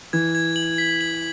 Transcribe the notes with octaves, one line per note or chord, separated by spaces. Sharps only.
E3 G#6
G#6
F#7
B6
F#7